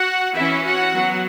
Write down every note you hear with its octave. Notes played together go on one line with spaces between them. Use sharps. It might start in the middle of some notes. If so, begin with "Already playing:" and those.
Already playing: F#4 F#5
E3 C#4 E4 E5
F#4 F#5
F#3 B3